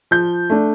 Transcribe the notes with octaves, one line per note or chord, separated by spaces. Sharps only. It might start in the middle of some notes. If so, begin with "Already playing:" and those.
F3 G6
A3 D4